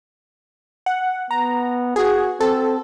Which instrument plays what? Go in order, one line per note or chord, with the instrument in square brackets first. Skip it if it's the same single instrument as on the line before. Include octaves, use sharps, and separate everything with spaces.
[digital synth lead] F#5
[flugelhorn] B3 [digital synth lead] A#5
[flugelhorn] F#4 [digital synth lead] G#4
[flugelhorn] C4 [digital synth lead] A4